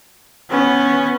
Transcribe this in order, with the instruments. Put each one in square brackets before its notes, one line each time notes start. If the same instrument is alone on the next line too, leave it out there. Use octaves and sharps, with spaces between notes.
[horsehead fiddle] B3 C#4